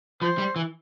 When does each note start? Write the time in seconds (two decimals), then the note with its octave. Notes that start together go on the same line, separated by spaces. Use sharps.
0.22 F3 C5
0.38 G3
0.56 E3